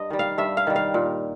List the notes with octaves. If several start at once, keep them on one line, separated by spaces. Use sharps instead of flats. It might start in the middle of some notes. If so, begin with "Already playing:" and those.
Already playing: G2 D#5
D#3 G3
F5
G2 E5
F5
D#3 G3
F5
A#2